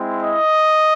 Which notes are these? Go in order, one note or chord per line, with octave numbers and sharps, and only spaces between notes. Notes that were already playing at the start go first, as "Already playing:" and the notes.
Already playing: G#3 C4 E4
D#5